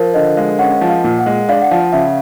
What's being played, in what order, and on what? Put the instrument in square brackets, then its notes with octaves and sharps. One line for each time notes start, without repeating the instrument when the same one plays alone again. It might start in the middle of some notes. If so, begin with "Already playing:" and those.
Already playing: [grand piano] F3 [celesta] A#4 C5
[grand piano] D3 [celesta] D#5
[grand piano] G#3 [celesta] F5
[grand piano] C#4 [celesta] F#5
[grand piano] F3
[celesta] F5
[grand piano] A#2
[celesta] F#5
[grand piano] G#3
[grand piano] D4 [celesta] F5
[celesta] F#5
[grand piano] F3 [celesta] F5
[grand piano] C#3 [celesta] E5